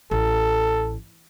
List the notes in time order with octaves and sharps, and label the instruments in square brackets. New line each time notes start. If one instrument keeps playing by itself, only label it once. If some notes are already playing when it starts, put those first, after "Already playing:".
[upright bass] A1 [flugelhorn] A4